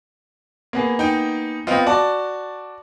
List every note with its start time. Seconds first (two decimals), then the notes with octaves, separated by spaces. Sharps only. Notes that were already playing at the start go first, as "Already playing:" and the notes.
0.73 A#3 B3 G#4
0.99 D#4 G5
1.67 B3 C4 F4 D#5 F5 G5
1.86 F#4 D5 A5